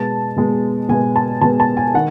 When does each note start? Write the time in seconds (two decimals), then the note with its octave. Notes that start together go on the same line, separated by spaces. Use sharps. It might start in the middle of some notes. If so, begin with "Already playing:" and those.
Already playing: B2 G#3 B3 A5
0.36 B2 G#3 B3
0.89 B2 G#3 B3 G#5
1.16 A5
1.41 B2 G#3 B3 A5
1.60 A5
1.77 G#5
1.94 D#3 F#5